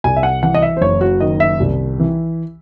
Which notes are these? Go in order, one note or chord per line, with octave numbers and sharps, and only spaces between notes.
C2 G#5
E5
F#5
E3 F#5
D#5
E5
C5
F#1 C#5
F#4
D#3 D#5
E5
C2
E3